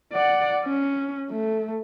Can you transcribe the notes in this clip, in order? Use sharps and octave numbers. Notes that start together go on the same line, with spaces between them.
D5 F#5
C#4
A3